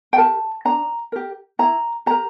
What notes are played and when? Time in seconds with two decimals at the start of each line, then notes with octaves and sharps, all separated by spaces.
0.13 G5
0.18 G4 A#4 A5
0.65 D4 A#5
1.12 G4 A#4
1.59 E4 A#5
2.06 G4 A#4 A#5